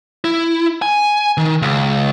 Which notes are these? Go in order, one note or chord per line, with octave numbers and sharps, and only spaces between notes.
E4
G#5
D#3
C#2